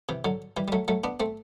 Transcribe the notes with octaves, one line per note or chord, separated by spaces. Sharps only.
C3 E3
D3 F#3
E3 G3
G3
F#3 A3
F#3 A3
B3 D4
A3 C4